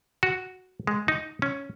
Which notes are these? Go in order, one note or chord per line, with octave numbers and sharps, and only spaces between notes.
F#4
G#3
D#4
C#4